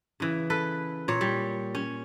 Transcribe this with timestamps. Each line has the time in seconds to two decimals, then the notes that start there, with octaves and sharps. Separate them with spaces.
0.20 C#3 E3
0.50 A4 B4
1.08 A#2 C#5
1.21 G3
1.75 C#4